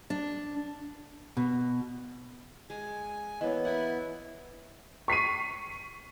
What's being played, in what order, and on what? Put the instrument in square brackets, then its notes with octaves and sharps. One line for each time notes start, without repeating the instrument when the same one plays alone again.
[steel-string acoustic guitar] D4
[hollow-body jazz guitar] B2
[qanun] G#3 [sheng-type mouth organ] G#5
[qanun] E3 A#3 [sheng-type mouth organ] B3 [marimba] C#5 D#5
[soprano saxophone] E4 [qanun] F#5 G#5 B5
[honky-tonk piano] C#6 B6 C7 D#7